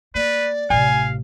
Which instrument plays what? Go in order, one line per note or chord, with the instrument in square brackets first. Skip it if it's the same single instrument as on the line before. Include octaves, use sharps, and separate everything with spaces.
[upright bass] A#3 [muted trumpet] B4 [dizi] D5
[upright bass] A1 C3 [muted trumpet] F5 [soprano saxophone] G#5